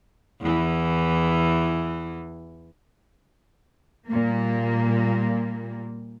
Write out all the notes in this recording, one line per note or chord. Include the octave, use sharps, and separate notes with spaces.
E2 E3
A#2 G3 A#3